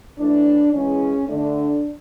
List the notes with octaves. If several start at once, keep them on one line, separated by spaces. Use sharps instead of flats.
A2 E3 A3 D4
C#3 E3 G#3 C#4
D3 A3 D4